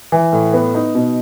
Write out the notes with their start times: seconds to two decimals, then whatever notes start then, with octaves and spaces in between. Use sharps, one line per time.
0.12 E3
0.33 A2
0.54 B3
0.75 D#4
0.95 B2